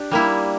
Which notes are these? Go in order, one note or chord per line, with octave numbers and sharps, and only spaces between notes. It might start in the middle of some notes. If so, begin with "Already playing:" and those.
Already playing: D4 G4
G3 A#3 E4